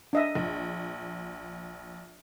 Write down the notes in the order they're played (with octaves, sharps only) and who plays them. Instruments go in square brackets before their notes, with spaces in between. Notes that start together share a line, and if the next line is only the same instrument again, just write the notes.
[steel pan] D4 D#5 E5
[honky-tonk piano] A#1